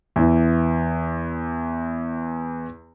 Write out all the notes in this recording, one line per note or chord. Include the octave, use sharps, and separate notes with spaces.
E2 E3